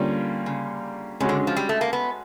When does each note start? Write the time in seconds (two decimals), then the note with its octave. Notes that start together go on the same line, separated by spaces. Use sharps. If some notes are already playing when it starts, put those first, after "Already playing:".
Already playing: D3 G3 A#3 C#4 F4
0.46 C#3
1.20 C#3 G#3 C#4 F#4
1.29 D3
1.47 F3
1.56 G3
1.69 A3
1.81 A#3
1.93 B3